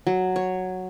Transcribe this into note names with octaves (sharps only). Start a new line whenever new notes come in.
F#3
C#5